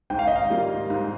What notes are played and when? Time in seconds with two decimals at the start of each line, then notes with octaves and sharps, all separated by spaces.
0.10 G#2 G5
0.19 F5
0.27 D#5
0.36 F5
0.50 G3 A#3 F4
0.90 G#2